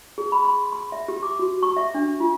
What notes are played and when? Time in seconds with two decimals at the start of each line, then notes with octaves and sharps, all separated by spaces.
0.18 G#4
0.32 B5
0.45 C6
0.72 C6
0.92 E5
1.08 G4
1.23 D6
1.39 F#4
1.63 C#6
1.77 E5
1.95 D4
2.20 F4